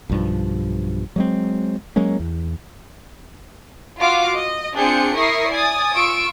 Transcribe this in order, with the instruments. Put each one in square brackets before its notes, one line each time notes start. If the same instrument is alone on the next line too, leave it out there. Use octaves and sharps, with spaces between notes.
[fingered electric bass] B1 G2 F3
F#3 G#3 C4
F#3 G#3 A#3 C#4
E2
[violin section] F4 F#4 F5 D6
D#5
C4 D4 F4 G#4 G6 C#7
E4 A#4 C#6 D#6 A#6 C7
D5 G#5 D#6 A6
F4 C#6 E6 D7